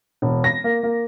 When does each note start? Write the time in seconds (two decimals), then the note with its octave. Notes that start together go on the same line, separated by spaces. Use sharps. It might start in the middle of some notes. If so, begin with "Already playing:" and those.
0.22 E1
0.44 A#6
0.64 A#3
0.83 A#3